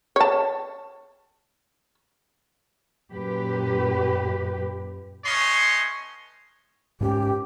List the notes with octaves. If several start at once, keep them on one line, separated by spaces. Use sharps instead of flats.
C#5 A5
F#2 A#2 G4 B4
A3 B3 C#4 C#5 D#5 C6
G#2 C4 C#4 G4